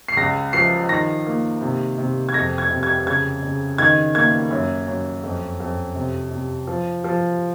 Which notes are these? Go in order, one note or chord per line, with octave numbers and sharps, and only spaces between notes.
C7
C#2 A#6
F3 C7
D#3 A#6
A#3
C3
C3
G#6
F2 A#6
G#6
C3
G#6
C#3 G#6
C#3
D#3 G#6
A#3 G#6
F#2
F#2
F2
F2
C3
C3
F3
F3